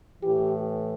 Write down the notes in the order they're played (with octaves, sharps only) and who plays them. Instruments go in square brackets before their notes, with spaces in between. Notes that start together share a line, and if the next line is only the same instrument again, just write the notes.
[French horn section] A2 E3 G4